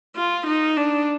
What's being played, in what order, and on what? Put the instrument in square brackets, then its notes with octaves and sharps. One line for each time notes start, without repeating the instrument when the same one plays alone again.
[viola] F4
D#4
D4